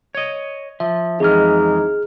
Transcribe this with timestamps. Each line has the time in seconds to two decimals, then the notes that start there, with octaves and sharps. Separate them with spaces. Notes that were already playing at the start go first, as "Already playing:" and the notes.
0.15 C#5 D#5
0.80 F3 E5
1.20 F2 E3 G#3 D#4 G#4 F6